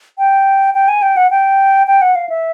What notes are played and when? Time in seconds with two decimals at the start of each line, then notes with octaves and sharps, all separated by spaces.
0.18 G5
0.74 G5
0.88 G#5
1.02 G5
1.17 F#5
1.31 G5
1.87 G5
2.02 F#5
2.15 F5
2.29 E5